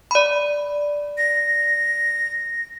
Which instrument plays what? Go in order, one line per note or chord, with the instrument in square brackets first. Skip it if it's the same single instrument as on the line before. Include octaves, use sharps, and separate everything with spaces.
[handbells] D5 B5
[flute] A#6